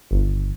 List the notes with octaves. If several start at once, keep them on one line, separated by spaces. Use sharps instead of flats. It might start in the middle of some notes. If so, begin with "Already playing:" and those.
G1